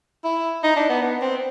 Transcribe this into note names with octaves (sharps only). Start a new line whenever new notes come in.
E4
D#4
D4
B3
B3
C4